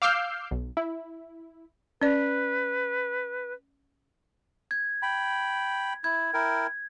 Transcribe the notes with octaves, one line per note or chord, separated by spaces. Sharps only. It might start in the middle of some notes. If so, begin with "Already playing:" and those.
F5 D6 E6 F6 G6 C7
B1
E4
C#4 B4 D5
G#6
G5 B5
E4 G#6
E4 A#4 G5